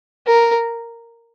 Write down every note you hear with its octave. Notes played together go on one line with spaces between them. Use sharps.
A#4